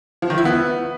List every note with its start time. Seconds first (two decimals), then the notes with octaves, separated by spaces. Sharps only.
0.22 F3
0.30 D#3
0.38 E4
0.45 B3